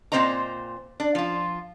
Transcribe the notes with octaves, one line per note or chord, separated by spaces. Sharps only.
A#2 A3 C4 C5 D#5 A#5
D4
F3 F4